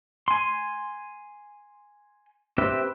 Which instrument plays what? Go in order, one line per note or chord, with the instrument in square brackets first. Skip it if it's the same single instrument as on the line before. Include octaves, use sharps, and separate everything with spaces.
[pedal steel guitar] G#5 C6
C4 G4 B4 E5